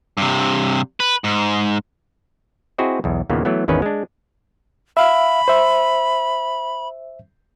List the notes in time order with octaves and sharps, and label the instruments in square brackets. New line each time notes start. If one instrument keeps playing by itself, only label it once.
[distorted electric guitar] G2 C3
B4
G#2
[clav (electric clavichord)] C4 E4 F#4 G#4 C5 D#5
B1 E2
D#2 A#2 C#3 E3 A#3 B3
E3 F#3 A3 B3
G#1 E2 D#3 C#4 B4
G#3 D4
[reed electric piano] E5 F5 [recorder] B5
[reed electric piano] C5 E5